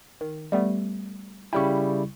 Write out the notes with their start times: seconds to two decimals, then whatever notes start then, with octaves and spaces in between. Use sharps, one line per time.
0.21 D#3
0.52 G3 A3 B3
1.53 C#3 G3 E4 G5 C#6